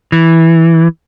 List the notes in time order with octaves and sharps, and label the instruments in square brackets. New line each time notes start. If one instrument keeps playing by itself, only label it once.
[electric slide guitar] E3